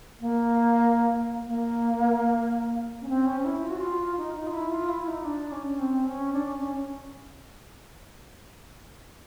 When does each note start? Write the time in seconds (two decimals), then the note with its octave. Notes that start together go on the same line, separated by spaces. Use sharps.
0.20 A#3
1.47 A#3
3.01 C#4
3.09 C4
3.26 C#4
3.45 E4
3.63 F4
3.70 F#4
3.77 F4
4.17 D#4
4.35 D#4
4.47 F4
4.53 E4
4.71 F4
4.89 E4
5.08 D#4
5.24 D4
5.52 C#4
5.79 C4
6.06 C#4
6.33 D4
6.47 C#4
6.60 C#4